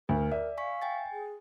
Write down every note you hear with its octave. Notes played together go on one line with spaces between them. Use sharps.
D2 A#4
D5 E5
F5 G#5 C#6 B6
G5 G#5 A6
G#4